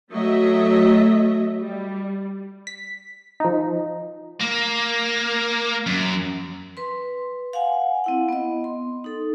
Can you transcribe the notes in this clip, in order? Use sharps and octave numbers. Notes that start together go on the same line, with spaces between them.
F#3 A3 D#5 E5
G3
B6
F3 D#4
A#3
F#2
B4 C6
F5 F#5 G#5
C4 E4 F#5
B3 D#5
C6
D#4 A4